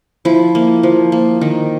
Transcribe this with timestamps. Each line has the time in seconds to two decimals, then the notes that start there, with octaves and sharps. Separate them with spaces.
0.25 F3 E4
0.55 A#3
0.83 F3
1.12 A#3
1.41 D#3